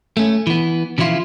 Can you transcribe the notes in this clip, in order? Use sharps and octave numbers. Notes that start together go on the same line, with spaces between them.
A3 C#4
E3 B3
C#3 E3 F3 E4 F4